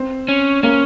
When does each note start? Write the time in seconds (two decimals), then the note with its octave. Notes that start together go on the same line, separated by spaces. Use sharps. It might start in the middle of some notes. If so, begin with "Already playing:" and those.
Already playing: C4
0.28 C#4
0.63 A#3 C#4